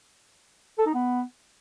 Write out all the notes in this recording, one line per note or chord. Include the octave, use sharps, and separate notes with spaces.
A4
D#4
B3